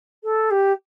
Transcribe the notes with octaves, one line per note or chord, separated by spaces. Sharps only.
A4
G4